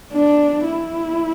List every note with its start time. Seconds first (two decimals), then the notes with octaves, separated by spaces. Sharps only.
0.13 D4
0.64 E4